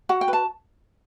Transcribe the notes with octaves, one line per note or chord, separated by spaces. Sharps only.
F#4 F#5
G5
B4
A5